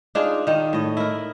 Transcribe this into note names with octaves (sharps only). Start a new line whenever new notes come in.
D4 D#4 F4 G#4
D#3 D#4
A2 D#5
E4 A#4